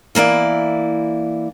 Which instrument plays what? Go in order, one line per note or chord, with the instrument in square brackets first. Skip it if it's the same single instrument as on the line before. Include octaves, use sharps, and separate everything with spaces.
[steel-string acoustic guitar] E3 A#3 E4 D5